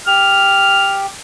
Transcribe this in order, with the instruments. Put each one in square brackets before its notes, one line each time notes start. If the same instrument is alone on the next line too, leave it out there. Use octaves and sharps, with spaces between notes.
[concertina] G4 [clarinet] F6